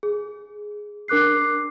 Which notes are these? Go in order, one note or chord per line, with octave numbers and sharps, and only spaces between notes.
G#4
D4 A#4 D6 F#6 C7